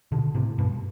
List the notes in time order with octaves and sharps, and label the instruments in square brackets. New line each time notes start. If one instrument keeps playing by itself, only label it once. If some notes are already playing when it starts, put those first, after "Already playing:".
[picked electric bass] B2 D3
A2 C3
G2 B2